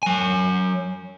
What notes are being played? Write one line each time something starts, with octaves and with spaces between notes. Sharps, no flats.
F#3 G#5